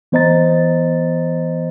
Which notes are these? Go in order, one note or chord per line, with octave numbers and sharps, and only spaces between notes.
E3 B3 C5 D#5 A#5 A6